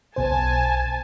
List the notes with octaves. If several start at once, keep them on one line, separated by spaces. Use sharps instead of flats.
B1 B2 C5 G#5 A5